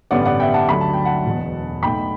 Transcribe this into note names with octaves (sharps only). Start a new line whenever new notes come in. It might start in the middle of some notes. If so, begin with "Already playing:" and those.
A1 G2 D3 G3 B3 D5 F#5
D5 F#5
E5 G5
F#5 A5
D2 D3 F#3 A3 B5
A5
G5
F#5 A5
E1 E2 B2
B1 B2 A3 G5 B5